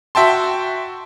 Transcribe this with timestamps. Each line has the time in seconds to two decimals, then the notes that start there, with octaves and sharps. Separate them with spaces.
0.15 F#4 E5 G5 A5 C6